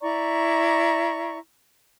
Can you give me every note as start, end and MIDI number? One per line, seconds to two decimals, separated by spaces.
0.01 1.37 64
0.01 1.37 74
0.01 1.37 82
0.01 1.37 85